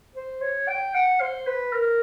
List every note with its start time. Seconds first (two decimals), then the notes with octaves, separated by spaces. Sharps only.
0.16 C5
0.42 C#5
0.68 G5
0.94 F#5
1.21 C5
1.47 B4
1.73 A#4